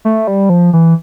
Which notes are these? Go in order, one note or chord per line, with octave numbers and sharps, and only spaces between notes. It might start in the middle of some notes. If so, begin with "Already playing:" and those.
A3
G3
F3
E3